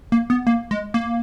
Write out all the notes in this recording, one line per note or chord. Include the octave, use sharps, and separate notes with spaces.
A#3
B3
A#3
G#3
A#3